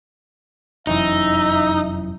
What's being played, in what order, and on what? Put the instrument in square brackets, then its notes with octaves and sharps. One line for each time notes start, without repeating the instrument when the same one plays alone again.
[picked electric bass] F1 F#2 E3 [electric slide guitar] D#4 [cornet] E5